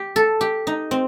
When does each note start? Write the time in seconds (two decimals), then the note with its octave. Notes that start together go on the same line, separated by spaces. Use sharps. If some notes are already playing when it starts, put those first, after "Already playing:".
Already playing: G4
0.16 A4
0.41 G4
0.67 D#4
0.91 C4